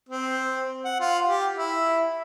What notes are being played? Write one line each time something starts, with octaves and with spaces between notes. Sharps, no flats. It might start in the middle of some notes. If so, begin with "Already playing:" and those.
C4
F#5
F4
G4
E4